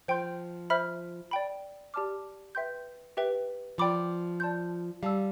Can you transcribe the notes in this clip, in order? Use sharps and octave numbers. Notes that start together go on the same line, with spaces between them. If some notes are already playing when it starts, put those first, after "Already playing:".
F3 C5 G5 C6 G6
C5 E5 B5 F6
D5 G5 B5
G4 D5 A5 D6 F6
B4 E5 G5 C6 G6
G4 B4 E5 G5
F3 D5 G5 B5 D6
D5 A5 C6 G6
G3 F5 A5 E6